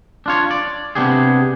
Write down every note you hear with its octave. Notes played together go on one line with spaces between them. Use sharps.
D4 F4 C#5
D5
C3 F#3 B3 D4 G4 G#4